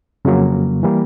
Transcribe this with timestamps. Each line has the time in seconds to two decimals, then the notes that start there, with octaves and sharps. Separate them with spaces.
0.25 F2 C#3 F#3 A#3
0.83 E3 G3 A#3